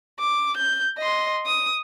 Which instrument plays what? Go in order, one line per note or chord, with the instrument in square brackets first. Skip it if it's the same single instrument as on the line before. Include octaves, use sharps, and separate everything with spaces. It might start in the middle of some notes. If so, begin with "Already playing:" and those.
[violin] D6
G6
D#5 C6
D#6